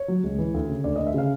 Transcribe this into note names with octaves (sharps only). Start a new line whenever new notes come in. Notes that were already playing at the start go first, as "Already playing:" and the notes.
Already playing: C#5
F#3
C#2
E3
D2
C#3
D2 D5
D2 D#5
E5
C#3 F5